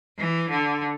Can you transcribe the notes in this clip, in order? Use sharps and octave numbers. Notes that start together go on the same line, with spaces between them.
E3
D3